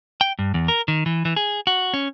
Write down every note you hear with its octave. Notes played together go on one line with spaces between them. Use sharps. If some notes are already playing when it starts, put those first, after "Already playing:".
G5
G2
E2
A#4
D#3
E3
E3
G#4
F#4
C#4